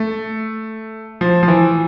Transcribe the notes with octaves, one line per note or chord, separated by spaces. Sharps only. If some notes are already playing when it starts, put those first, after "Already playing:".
Already playing: A3
F3
F3
E3